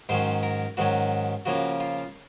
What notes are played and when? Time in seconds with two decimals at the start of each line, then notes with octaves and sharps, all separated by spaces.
0.09 G#2 D#3 F#3 C#4 C5
0.43 A#4
0.77 G#2 D#3 F#3 C#4 F#4
1.46 C#3 F3 A#3 C#4 F#4
1.80 F4